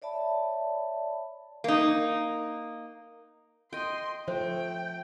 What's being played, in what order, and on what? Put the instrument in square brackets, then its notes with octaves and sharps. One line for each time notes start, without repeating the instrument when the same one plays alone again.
[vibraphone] C#5 D5 E5 A5 B5
[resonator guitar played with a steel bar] A#3 D#4
[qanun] D#5 G5 [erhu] C6
[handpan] F3 [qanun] A3 [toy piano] C5 [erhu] G5